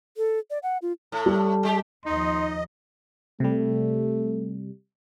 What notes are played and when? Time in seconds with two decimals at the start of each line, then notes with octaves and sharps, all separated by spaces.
0.17 A4
0.50 D5
0.63 F#5
0.82 F4
1.12 A2 A3
1.26 G3
1.63 G#3 G4
2.06 D#2 F3 D#4 D#5 C6
3.40 C3 G3 A3